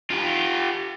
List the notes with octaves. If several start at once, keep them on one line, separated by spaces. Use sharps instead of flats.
F4 G4